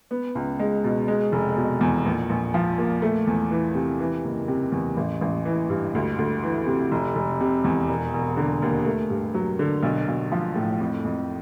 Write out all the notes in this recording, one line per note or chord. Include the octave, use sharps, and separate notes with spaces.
B3
C#2
G#3
B2
G#3
F1
B2
E2
A#1
A#1
F3
A#2
A3
E2
E3
C3
E3
F#1
C3
E2
A1
A1
E3
G2
D2
D2
E3
C3
F1
F1
C3
E2
E1
E1
D3
D#2
A3
G2
F#3
D3
B1
B1
F3
A2
F2
F2